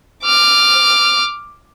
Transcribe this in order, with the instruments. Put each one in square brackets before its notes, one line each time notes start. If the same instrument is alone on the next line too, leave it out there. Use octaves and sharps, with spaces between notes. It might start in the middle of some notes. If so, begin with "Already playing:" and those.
[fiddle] D6 F6